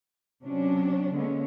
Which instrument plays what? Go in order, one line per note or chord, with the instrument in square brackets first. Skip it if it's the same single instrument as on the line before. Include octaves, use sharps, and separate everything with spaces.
[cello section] C3 F#3 C#4 D4
D3 G#3 A#3 B3 C#4